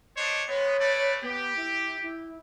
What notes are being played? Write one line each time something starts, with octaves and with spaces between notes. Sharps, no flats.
D4 C5 C#5 D#5
G#3 B3 C#5
A3 B4 D5
B3 G4
E4
E4